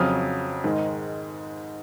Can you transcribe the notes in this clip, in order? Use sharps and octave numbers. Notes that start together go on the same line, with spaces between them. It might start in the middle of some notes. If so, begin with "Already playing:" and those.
Already playing: F2 C#3 F#3 D#6 F6
G#2 D#3 G#3